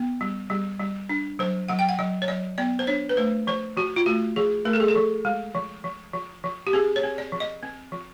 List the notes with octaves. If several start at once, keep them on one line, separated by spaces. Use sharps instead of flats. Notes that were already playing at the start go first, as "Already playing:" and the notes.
Already playing: B3
G3
G3
G3
D4
F#3 C5
F#3 F#5
G5
F#5
F#3 D5
C#5
F#3 D5
B3 D5
C5
D4 C#5
B4
A3 C5
F3 C5
F3 F#4
F4
A3 F#4
F3 G#4
A3 A#4
A4
G#4
A4
F3
G#3
F3
F3
F3
F3
G4
C4 G#4
C#5
C4
D5
F3
D#5
C4
F3